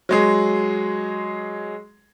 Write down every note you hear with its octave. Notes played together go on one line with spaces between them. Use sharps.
F#3 G#3 G#4